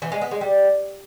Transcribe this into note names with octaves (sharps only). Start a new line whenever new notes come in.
E3
G#3
B3
G#3
G3